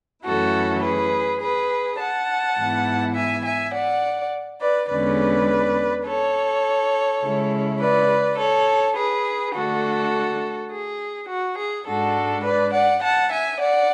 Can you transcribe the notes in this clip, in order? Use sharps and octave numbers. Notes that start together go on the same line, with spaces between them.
F#2 E3 A3 C#4 E4 F#4 A4
G#4 B4
G#4 B4
F#5 A5
G#2 E3 B3 E4
E5 G#5
E5 G#5
D5 F#5
B4 D5
E2 D3 G#3 C#4 B4 D5
A4 C#5
C#3 G#3 C#4 E4
B4 D5
A4 C#5
G#4 B4
D3 A3 D4 F#4 A4
G#4
F#4
G#4
G#2 G#3 D4 F#4 A4
B4 D5
D5 F#5
F#5 A5
E5 G#5
D5 F#5